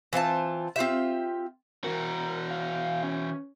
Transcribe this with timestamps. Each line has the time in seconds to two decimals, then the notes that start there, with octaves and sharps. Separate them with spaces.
0.13 E3 C4 F4 A5
0.76 C4 F4 G4 E5
1.84 E3 F#4 A#4
2.50 F5
3.03 C#4